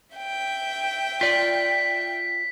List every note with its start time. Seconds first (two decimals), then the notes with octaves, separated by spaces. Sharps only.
0.16 E5 G5
1.21 F4 D5 B6